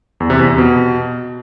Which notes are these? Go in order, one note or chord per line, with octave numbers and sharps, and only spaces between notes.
E2
C3
E2
C3
B2